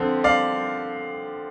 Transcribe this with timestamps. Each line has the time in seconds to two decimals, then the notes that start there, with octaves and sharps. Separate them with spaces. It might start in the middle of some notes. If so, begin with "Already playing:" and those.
Already playing: D3 F3 C4
0.24 D5 F5